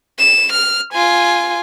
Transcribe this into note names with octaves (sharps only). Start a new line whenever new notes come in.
E7
F6
F4 G#5